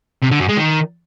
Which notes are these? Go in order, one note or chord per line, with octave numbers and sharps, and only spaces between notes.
C3
D3
F#2
G#3
D#3